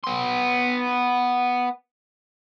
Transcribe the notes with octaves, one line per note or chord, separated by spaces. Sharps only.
B3 C6